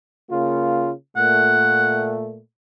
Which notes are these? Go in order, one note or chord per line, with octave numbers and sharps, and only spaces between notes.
C#3 A#3 F4
A#2 A3 F#5